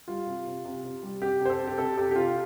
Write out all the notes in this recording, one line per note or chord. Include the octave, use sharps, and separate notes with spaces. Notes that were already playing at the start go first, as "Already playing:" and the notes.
G3 F4
C3
C3
C3
C3
G3
C3 G4
C3 C5
A4
C3
G4
C3 A4
C3 G4
G4
C3 F4